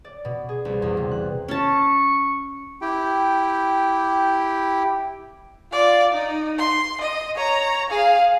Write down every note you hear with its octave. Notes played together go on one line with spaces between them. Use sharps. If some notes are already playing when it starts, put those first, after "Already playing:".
D5
B2
G#4
C2
E2
C3
F#6
C#4 A5 C#6
E4 G4 G5
F4 D5
D#4
C6
D#5
C#5 A#5
G#4 F5